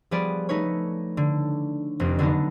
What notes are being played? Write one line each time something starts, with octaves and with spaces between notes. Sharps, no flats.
F3 G3 B3 G#4 B4 D5
A3 D#4 B4 C#5
D3
F1 F2
D3 F#3 B3 D4 D#4